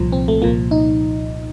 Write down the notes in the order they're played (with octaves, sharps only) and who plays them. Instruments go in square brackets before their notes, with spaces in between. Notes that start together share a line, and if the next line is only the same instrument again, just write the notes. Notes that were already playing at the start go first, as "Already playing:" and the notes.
Already playing: [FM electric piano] C2 A#2 F3
C4
A3
C2 A#2 F3 A#3
D#4